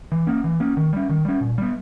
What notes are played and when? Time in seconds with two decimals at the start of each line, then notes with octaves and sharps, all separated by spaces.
0.12 E3
0.27 A#3 C#4
0.44 E3
0.60 A#3 C#4
0.77 D#3
0.93 G3 C#4
1.09 D#3
1.25 G3 C#4
1.41 A#2
1.58 G3 B3